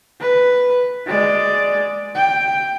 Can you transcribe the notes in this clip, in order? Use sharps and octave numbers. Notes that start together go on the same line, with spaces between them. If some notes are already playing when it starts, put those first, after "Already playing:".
B4
G#3 D5
G5